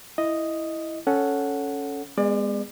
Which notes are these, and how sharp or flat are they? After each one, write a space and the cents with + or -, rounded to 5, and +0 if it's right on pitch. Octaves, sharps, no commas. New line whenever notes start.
E4 +0 D#5 +0
C#4 +5 A4 +0 F#5 -5
G#3 -25 B3 +0 D5 +30